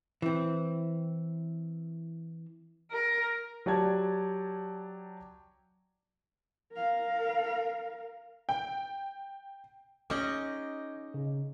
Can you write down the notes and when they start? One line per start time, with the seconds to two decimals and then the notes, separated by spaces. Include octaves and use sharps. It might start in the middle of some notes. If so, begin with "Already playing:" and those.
0.22 E3 C4
2.91 A#4
3.66 F#3 G4 D5 A5 G#6
6.73 A#4 F5
8.49 G5
10.10 C#4 D#4 G#4 D#5 D6 G6 A#6
11.14 C#3